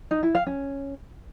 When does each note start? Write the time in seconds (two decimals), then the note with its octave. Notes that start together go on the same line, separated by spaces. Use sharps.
0.11 D#4
0.23 E4
0.35 F5
0.47 C#4